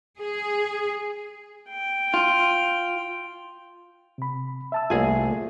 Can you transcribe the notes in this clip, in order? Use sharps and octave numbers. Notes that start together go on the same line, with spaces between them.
G#4
G5
F4
C3 B5
E5 A5 E6
C2 A3 A#3 F4 G#4 G#5